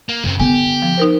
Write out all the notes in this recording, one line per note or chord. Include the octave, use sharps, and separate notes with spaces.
A#3
F#2 C#3 C4
D3 B3 G4 G#5
F3
D#4 A#4 C5